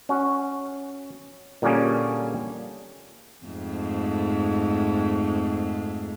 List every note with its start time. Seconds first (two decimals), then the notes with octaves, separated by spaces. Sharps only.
0.09 C#4 F#4
1.62 A#2 D3 G3 A#3 C#4 G#4
3.46 F2 G#2 A3